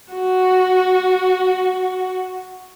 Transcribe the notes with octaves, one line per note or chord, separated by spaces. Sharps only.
F#4